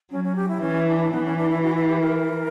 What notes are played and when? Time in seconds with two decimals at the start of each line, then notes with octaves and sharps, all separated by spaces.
0.11 F#3 C#4
0.24 C#4
0.36 G4
0.48 E4
0.61 E3 C#4
0.87 D4
1.11 E3 B3
1.25 C#4
1.37 D4
1.49 E4
1.62 F#4
1.75 E4
1.87 G4
2.00 A#4